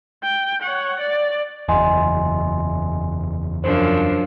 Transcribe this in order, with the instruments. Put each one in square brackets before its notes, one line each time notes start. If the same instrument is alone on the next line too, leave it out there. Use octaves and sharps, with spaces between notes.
[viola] G5
C#5 F#5
D5
[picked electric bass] F#1 E2 [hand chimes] D#5 G#5 C6
[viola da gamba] F#2 F3 D4 [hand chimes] C5